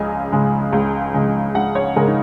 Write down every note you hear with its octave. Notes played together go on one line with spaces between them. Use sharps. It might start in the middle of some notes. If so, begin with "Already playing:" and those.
Already playing: C#2 C#3 G#3 D#5 G#5
C#3 G#3
C#2
C#3 G#3
C#2 F#5
C#5
C#3 G#3 A#4
D#4